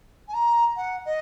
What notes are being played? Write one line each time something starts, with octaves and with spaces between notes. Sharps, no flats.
G#5
A#5
F#5
D#5